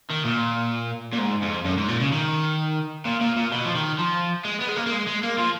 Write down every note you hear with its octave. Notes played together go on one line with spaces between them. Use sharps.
D#3
A#2
A#2
G#2
F2
F#2
G#2
A#2
C#3
D#3
A#2
A#2
A#2
B2
F3
D#3
F3
G#3
B3
G#3
A#3
A#3
G#3
G#3
A#3
F3